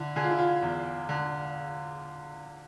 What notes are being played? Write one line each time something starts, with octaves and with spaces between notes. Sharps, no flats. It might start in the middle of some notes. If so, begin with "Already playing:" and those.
Already playing: D3 E4
D3 G#4
F4
E4
F4
E2
D3